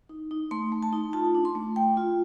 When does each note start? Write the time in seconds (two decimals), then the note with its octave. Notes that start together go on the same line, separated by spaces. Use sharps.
0.09 D#4
0.31 D#4
0.51 A3 C6
0.72 A3
0.83 A5
0.93 D#4
1.13 F4 A5
1.35 D4
1.45 C6
1.55 A3
1.76 A3 G5
1.97 F4